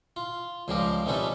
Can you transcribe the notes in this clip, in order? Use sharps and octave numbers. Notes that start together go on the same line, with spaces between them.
F4
C#2 C#3 F3 G3 G4 A#4
C3 D#3 G3 C#4 A4 B4